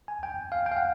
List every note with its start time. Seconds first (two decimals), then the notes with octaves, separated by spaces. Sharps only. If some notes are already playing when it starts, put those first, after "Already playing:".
0.08 G#5
0.23 G5
0.52 F5
0.66 G5
0.71 F5
0.77 F#5